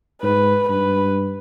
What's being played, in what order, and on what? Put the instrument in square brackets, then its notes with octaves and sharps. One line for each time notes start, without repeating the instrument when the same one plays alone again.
[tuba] G#2 [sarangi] B4
[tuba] G2 [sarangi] B4